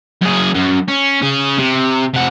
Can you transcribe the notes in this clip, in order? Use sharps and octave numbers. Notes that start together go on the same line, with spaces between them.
F#2 G#4
F#2
C#4
C#4 G#4
C3
C3 F#5